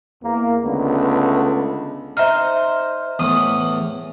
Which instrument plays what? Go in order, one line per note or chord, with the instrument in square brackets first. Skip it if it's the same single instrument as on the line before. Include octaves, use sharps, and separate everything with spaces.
[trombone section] E2 A#3
C#2 D3 A3 B3
[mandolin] D#4 C5 [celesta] E5 F6
[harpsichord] E2 A2 [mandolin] D#6